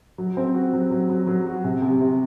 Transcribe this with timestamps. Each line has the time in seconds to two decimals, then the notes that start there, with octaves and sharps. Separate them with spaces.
0.18 F#3
0.37 C4
0.54 F#4
0.73 F#3
0.91 F#3
1.10 F#3
1.27 F#3
1.47 F#4
1.64 C3
1.82 C3
2.00 C3